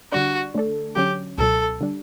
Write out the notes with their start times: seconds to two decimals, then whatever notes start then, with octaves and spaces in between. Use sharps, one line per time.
0.12 D3 G3 D4 F#4
0.54 D3 A3 D4 A4
0.96 D3 F#3 C#4 G4
1.38 C#2 B2 F#3 A4
1.81 D3 G3 D4